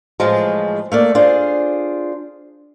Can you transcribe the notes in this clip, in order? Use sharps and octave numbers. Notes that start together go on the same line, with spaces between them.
A2 E3 F3 G#3
A3 A#3 D5
D4 F4 G#4 C5